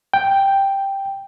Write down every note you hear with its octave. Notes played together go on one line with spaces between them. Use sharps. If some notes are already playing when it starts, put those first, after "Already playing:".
G5